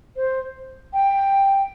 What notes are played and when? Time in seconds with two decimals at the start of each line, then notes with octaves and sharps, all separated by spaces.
0.16 C5
0.93 G5